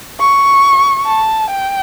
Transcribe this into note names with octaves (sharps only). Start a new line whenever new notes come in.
C#6
A5
G5